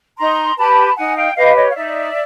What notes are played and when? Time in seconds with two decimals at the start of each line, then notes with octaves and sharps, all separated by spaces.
0.18 D#4 A#5 C6
0.57 G4 B4 A5 B5
0.96 D#4 F#5 G#5
1.16 F5 G5
1.36 G4 B4 D#5 F5
1.55 C#5 D#5
1.69 F5
1.75 D#4 D5 E5